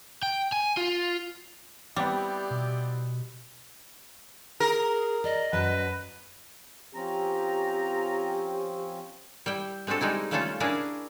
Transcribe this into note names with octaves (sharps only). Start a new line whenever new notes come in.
G5
G#5
F4
G3 B3 C4 E4 G4 D5
B2
G#4 A#4
D5 D#5
F#2 F#3 B4 A5
F3 C4 C#4 G4 A#5
G3 E4 G5
G#3 C4 D4 F#4 A4
G3 G#3 D#4 E4
C#3 G3 A3 C#4 F4 A4
C#4 D4 E4 G#4 A#4 F5